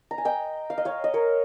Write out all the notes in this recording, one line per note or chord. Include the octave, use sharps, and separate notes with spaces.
A#5
G#5
D#5 G5
F5
D#5
C#5 F5
D#5
A#4 C#5